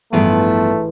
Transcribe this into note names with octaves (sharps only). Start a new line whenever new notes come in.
A1 G2 E3 F3 A3 B3 G#4